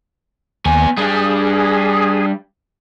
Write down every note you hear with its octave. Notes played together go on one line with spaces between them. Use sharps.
D#2 B3 G#5
G3 D4 G#4